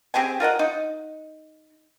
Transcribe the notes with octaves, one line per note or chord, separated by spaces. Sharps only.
C4 G4 G#4 G#5
F4 A#4 D#5 F#5
D#4